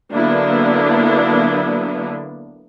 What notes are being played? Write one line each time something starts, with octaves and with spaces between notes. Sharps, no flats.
D3 F#3 A#3 B3 D4 E4